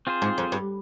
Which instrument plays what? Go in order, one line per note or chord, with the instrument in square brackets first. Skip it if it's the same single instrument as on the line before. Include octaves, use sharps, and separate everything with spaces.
[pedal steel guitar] C4 F4 G#4 C5
[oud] G#2
F2
G2